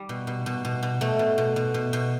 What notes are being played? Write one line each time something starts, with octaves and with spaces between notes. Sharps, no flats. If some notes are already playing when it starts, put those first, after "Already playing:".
Already playing: G3
B2
B2
B2
B2
B2
B2 A3
B2
B2
B2
B2
B2